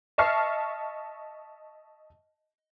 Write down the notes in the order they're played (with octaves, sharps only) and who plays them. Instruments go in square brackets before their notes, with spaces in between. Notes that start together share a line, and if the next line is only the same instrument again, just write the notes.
[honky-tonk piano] D#5 E5 A5 C#6 F6 C7